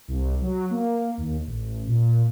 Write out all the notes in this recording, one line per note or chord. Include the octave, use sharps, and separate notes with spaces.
C2
F#3
A#3
D#2
A1
A#2